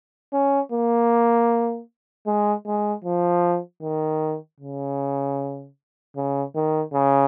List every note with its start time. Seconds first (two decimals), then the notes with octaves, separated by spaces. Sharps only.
0.33 C#4
0.72 A#3
2.26 G#3
2.66 G#3
3.04 F3
3.82 D#3
4.60 C#3
6.16 C#3
6.55 D#3
6.93 C#3